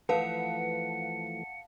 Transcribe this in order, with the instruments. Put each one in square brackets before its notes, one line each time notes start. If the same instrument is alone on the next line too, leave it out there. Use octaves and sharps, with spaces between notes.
[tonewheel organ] E3 F3 A3 [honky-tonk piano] B4 [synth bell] F5 F#5 A5 [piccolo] C#7